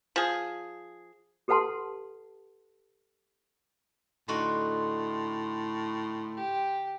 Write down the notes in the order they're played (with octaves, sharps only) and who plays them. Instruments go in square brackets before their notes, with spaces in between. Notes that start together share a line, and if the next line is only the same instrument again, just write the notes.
[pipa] F3 G#4
[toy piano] G4 A4 B4 F#5 A5 C6
[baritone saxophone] A2 [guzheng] D3 D#4 F#4 [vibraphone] C6
[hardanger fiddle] G4